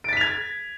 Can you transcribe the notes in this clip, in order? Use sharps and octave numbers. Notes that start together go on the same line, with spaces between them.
G#6 A6 B6 D7 F7